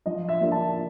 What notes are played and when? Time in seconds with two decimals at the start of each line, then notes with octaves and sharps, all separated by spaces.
0.06 F3 D#5
0.29 E5
0.40 A#3 D4 F4
0.52 A5